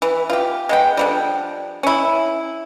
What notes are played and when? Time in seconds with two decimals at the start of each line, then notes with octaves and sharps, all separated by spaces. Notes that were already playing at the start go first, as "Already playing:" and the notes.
0.02 E3
0.30 F4 G4
0.69 G#3 B3 G5
0.97 D3 F3 G3
1.83 C#4 E4